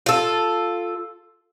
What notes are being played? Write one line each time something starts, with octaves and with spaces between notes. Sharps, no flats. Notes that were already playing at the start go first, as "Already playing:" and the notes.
F4 A4